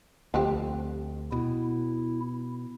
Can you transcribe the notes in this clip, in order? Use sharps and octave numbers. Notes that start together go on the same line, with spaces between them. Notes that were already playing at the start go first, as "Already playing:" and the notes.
D2 F3 C4 G4
B2 E4